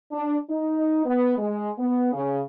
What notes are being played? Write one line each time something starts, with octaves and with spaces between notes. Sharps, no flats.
D4
D#4
B3
G#3
B3
C#3